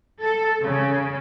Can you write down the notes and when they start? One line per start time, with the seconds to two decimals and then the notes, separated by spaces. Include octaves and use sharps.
0.22 A4
0.63 C#3